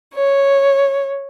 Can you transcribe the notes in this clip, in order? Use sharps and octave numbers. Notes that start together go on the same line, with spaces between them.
C#5